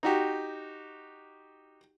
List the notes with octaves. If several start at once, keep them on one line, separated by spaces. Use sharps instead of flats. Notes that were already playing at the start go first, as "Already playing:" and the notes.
D#4 F#4 G4